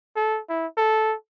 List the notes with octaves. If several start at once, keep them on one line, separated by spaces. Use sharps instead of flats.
A4
E4
A4